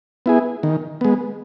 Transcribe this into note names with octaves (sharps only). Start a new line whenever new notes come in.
B3 E4 G#4
D#3
G#3 B3